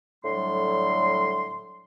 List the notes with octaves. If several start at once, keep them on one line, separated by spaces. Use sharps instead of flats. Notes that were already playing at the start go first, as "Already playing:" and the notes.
A2 D3 F#3 G3 C6